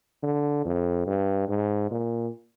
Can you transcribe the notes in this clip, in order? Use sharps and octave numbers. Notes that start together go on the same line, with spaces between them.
D3
F2
G2
G#2
A#2